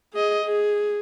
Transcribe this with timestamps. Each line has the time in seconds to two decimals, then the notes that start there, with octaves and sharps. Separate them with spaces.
0.14 G#4 D#5
0.45 G#4